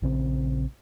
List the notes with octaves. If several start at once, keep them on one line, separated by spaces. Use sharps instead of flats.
A#1 C#3 C4